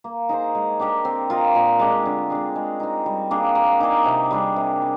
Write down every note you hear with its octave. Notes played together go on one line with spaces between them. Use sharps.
A#3
D#4 G#4 C5
G#3
D4 G4 A#4
C4
F4 A#4 D#5
A#2
G#3 D4 G4
D3
G#3 D4 G#4
G#3
C4 D#4
G3
A#3 D4 G#4
A#3
D#4 G#4 D5
C3
G3 D4 G#4
C3
G3